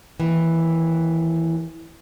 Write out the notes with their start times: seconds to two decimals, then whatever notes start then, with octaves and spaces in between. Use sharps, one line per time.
0.20 D#2 E3